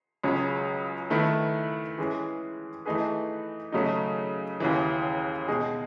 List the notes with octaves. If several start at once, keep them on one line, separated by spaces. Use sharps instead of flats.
C#2 C#3 F#3 C#4 G#4
D#3 A3 E4 B4
E3 G#3 C#4 G#4 B4
E3 A3 D#4 G#4 B4
C#3 F#3 A3 D#4
D#2 C#3 E3
B2 G#3 D#4 G#4